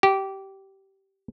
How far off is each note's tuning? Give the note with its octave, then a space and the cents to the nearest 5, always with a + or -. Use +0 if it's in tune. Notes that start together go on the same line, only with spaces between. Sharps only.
G4 -20